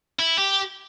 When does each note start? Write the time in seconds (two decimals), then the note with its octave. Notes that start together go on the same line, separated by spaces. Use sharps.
0.19 E4
0.38 G4